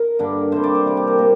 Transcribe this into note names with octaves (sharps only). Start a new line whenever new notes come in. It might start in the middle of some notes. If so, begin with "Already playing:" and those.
Already playing: A#4
G2 D3 A#3 D4
C3 G3 A#3 C5
D5
C5
C3 G3 A#3
G4
A#4
A#2 A#4